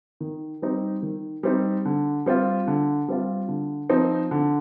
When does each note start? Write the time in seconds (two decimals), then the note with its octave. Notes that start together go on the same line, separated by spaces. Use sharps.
0.21 D#3
0.62 G3 C4 D#4
1.03 D#3
1.43 G3 C4 D#4
1.85 D3
2.26 G3 C4 F4
2.67 D3
3.08 G3 C4 F4
3.48 D3
3.90 F3 C4 D#4
4.31 D3